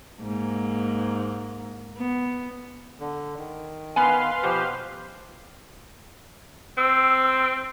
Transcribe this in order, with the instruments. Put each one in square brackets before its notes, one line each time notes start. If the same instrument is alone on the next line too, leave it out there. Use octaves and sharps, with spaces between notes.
[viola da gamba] G#2 A#3
B3
[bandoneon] D3
D#3
[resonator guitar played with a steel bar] B3 G#5 [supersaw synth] B4 F5 C6
[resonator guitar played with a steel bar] B2 [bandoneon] F3 G4 C5
[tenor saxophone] C4 [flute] E6